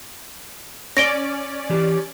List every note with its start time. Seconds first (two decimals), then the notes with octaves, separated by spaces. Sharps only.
0.97 C#4 D5 A#6 D7 G7
1.70 E3 G4